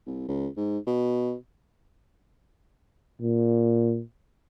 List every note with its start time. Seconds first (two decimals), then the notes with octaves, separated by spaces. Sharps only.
0.06 C2
0.28 C#2
0.57 G#2
0.87 B2
3.22 A#2